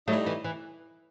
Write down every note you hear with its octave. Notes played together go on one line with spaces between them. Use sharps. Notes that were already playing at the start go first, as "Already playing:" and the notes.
A2 F#3 G3 A3 D#4
E3
E3